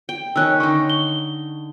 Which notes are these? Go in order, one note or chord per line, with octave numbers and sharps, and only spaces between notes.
G5
D#3 C#4 E6 F#6
D3 D#4 C#6
G7